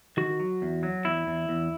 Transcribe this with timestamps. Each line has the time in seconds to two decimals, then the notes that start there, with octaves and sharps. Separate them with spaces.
0.17 D#3 F#4
0.40 F#3
0.62 E2
0.83 F#3
1.05 E2 E4
1.27 E2
1.49 E2